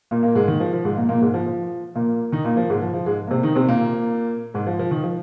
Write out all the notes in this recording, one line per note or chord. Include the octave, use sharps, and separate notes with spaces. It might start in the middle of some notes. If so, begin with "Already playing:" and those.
A#2 A#3
A#2 A#3
G#2 G#3
D#3
F3
F3
G#2 G#3
A#2 A#3
A#2 A#3
G#2 G#3
F3
F3
A#2 A#3
D#3 D#4
A#2 A#3
F3
G#2 G#3
F3
F3
G#2 G#3
A#3
C3 C4
D#3 D#4
C3 C4
A#2 A#3
G#2 G#3
F3
F3
D#3
F3